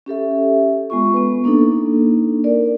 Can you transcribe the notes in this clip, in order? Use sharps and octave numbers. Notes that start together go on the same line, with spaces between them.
C#4 G4 A4 E5
G#3 B3 F4 C#6
B3 B4
A#3 D4 D#4 A4
A#4 D5